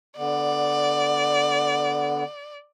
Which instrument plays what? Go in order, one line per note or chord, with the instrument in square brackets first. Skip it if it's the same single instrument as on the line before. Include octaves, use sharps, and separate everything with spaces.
[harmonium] D3 B3 [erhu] D5